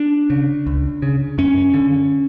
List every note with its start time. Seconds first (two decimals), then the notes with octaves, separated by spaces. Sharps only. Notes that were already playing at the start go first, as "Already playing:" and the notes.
Already playing: D4
0.30 C#3
0.66 C#2
1.02 C#3
1.38 F#2 C#4
1.74 D3